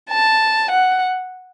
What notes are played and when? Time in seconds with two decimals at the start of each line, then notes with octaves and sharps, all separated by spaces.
0.10 A5
0.71 F#5